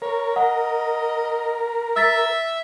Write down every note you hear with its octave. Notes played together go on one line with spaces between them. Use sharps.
A#4 C#5
D#5 F#5
E5 E6 A6 B6